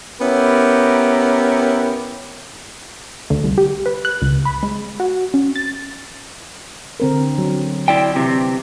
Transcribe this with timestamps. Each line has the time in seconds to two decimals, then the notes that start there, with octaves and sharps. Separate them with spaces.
0.20 B3 C#4 E4 G4 A#4
3.30 D2
3.44 C2
3.58 G4
3.86 B4
4.05 F#6
4.22 C#2
4.45 B5
4.63 G#3
5.00 F#4
5.34 C#4
5.56 A6
7.00 D3 C4 A#4
7.38 F#3
7.88 E4 D5 G5
8.16 C3 E3